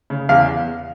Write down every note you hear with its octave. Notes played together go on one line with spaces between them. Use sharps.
C#3
E2 F5